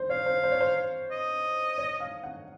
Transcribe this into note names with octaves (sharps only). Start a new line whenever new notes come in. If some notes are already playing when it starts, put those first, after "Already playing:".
Already playing: C5
C#5 F5
C5
C5
C#5
C5
D#5
C#5
F5
F#5